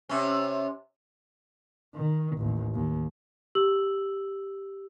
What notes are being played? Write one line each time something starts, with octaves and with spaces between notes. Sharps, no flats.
C3 C#4
D#3
A1 D#2
D#2
G4 E6 F#7